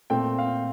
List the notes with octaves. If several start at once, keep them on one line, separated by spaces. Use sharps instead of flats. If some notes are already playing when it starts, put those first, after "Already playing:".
A#2 A3 C4 G5
F5